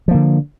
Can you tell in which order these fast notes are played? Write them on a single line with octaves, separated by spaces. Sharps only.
F3 A#3 D3